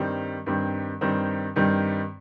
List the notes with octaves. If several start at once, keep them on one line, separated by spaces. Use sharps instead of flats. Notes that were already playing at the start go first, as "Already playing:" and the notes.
Already playing: G2 D#3 G3 C4
G2 D#3 G3 C4
G2 D#3 G3 C4
G2 D#3 G3 C4